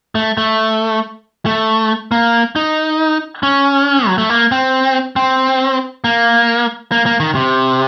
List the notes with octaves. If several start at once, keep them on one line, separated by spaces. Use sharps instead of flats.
A3
A3
A3
A#3
D#4
C#4
F#3
A3
A#3
C4
C4
A#3
A#3
A#3
D#3
C3